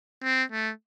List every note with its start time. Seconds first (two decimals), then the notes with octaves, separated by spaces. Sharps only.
0.23 C4
0.52 A3